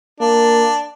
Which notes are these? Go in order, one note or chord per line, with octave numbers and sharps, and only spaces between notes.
A#3 D4